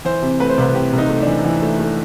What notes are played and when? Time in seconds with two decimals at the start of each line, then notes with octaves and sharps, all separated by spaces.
0.05 E3 C5
0.22 C3
0.40 A3 B4
0.50 C5
0.58 C2 B4
0.75 C3 G4
0.93 C2
0.98 D#4
1.09 A3
1.22 E3 D4
1.44 E3
1.62 A3
1.79 A3